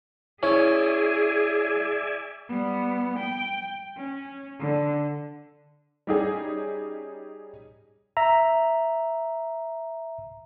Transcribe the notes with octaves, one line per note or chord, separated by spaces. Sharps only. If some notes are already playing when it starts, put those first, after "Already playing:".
C#4 E4 G#4 D5 E5 G#5
G3 B3
G5
C#4
D3
G3 C#4 D#4 G4 G#4
E5 A#5